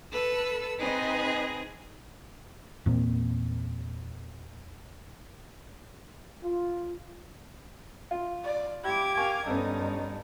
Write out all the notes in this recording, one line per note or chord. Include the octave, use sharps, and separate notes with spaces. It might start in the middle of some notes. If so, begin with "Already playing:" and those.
A4 B4 E6
C4 D#4 G#4 B4 D#5
E2 A#2 A#3 C4
F4
F4
D5
E4 G4 D6 G#6
A#4 F5 G#5 C#6
G2 B3 C#4 D#4 A4